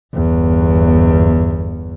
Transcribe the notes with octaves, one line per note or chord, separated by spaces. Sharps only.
G1 E2